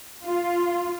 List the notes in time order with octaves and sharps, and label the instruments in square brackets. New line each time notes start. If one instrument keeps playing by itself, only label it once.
[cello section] F4